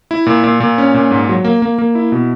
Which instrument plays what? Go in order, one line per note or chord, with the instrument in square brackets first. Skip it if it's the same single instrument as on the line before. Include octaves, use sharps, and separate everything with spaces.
[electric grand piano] E4
A#2
A#2
A#2
C#4
A#2
G#2
F#3
A#3
A#3
A#3
E4
B2